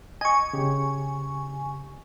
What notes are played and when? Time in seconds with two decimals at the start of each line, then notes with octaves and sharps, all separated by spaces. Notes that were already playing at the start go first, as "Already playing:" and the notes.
0.21 D#5 G#5 C#6
0.53 C#3 G4